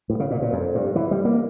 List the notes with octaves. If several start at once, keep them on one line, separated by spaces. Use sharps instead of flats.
A2
C#3
A#2
A#2
F2
G2
E3
G3
A#3